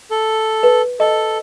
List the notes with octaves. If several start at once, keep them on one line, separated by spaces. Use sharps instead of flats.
A4
B4
A4 D#5